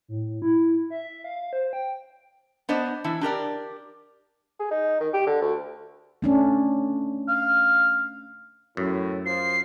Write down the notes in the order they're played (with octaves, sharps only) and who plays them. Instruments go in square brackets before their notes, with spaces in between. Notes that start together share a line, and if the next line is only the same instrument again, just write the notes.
[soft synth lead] A2
E4
E5
F5
C5
G5
[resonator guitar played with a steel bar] B3 D4 C5 D#5
E3 D4 E4
D4 G4 A#4 D5
[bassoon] G#4
D#4
D#3
G4
D3
D2
[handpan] A3 C#4 D4
[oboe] F5
[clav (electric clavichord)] F#2 [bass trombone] A2
[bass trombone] F3 [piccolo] C7